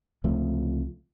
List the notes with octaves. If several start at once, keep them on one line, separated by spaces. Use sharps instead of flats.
C#2 C3 F3 A3